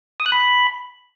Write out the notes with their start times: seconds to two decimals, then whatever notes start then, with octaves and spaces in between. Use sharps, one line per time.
0.20 D#6
0.26 F#6
0.32 B5